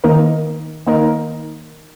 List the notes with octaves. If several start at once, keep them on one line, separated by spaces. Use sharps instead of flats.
D#3 A#3 D#4 A#4
D#3 A#3 D#4 A#4